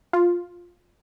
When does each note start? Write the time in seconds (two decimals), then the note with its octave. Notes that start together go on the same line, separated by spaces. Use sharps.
0.13 F4